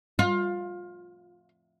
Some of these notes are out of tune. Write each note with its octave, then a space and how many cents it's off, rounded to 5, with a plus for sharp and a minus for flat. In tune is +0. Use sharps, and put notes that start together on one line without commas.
F4 +20